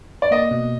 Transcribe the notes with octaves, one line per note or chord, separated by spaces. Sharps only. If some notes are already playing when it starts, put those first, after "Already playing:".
D5
A#3 D#5
B2